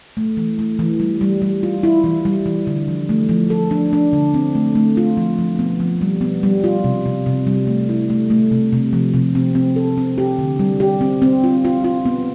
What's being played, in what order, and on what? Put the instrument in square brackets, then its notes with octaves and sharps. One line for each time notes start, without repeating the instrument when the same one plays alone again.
[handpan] A3
E3
A3
E3
G3
G3
G3
F4
E4
E3
G3
E3
D3
F3
A3
F3
A4
D4
D4
D3
C4
A3
A3
F4
F3
F3
B3
F3
G3
B3
G3
F4
C3
C3
C3
G3
A3
E4
A3
A3
C3
C3
F3
C3
C4
C4
A4
C4
G4
D3
G3
G4
C4
C4
F4
F4
F4
B3